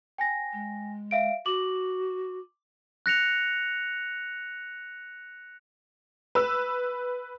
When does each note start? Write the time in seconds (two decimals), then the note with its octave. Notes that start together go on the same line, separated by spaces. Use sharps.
0.18 G5 G#5 A#6
0.53 G#3
1.11 E5 F5 D7
1.46 F#4 D6 F#7
3.06 F#6 A#6 C#7 F7
6.35 B4 E6